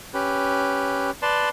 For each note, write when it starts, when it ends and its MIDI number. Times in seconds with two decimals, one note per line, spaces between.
0.14 1.11 61
0.14 1.11 67
0.14 1.11 71
1.22 1.49 71
1.22 1.49 74
1.22 1.49 81
1.22 1.49 84